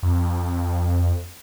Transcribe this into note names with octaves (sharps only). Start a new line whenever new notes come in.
F2